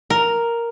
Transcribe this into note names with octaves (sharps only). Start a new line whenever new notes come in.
A#4